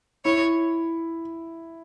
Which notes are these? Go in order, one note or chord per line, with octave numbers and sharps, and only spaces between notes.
E4 C#5